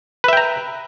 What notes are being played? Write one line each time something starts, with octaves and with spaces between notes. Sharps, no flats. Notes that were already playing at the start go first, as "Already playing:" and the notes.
B4 E5 G5 A#5